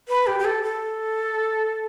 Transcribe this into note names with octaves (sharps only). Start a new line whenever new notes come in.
B4
G4
G4
A4
A4